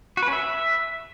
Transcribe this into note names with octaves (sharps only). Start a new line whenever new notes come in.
F#4
B4
C#4
E5